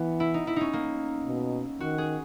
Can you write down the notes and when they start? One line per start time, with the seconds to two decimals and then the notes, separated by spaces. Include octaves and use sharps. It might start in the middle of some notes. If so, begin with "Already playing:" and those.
Already playing: E3 B3
0.20 E4
0.34 D#4
0.47 E4
0.56 C#4 D#4
0.73 A#3
1.26 B2
1.80 D#3 F#4
1.98 G#4